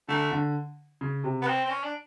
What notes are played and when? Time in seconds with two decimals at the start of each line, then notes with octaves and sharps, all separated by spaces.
0.08 D3 A3
0.31 D3
1.01 C#3
1.24 C3
1.42 B3
1.47 C4
1.65 C4
1.70 C#4
1.83 D4